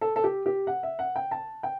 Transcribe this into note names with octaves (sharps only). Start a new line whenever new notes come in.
A4
A4
G4
G4
F#5
E5
F#5
G5
A5
G5